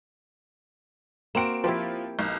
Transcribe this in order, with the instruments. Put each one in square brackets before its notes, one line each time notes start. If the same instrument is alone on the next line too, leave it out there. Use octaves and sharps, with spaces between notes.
[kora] A#3 C4 F#4 [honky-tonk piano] D7 E7
[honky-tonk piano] F3 [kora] E4 G4 C5
[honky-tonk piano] B1